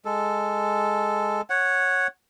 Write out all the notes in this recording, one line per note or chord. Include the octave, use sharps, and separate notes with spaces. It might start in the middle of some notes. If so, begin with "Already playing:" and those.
G#3 A4
C#5 F#5